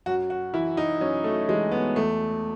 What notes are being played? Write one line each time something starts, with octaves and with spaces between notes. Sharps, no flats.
F#2 F#4
F#4
E3 E4
D#4
F#2 C#4
A3
E3 G#3
B3
E2 A3